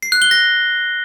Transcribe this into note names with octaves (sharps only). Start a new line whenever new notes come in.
C7
F#6
G7
A#6